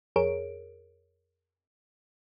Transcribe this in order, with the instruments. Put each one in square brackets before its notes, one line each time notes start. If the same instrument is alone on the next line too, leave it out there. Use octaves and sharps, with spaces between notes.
[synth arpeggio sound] F2 G#4 A#4 C#5 D7